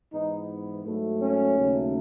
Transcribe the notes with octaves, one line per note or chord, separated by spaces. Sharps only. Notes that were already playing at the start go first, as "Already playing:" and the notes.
G#2 E3 B3 D#4
G#2 F#3 A3
C#4
D#2 C#3 F#3 A3